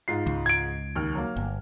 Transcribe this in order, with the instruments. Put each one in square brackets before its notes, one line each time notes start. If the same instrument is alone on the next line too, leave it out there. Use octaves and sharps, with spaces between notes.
[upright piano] G#2 F4 C7
[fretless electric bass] C#2
[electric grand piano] G#6 D7
[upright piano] D#2 F6
F#3 A#3
[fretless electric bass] G1